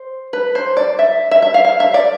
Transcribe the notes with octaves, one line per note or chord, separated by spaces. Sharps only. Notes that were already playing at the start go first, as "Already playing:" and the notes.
Already playing: C5
B4
C5
D5
E5
E5
E5
F5
F5
E5
D5